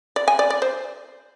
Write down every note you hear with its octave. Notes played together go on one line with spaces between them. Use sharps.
D5
G#5
D5
D5
C5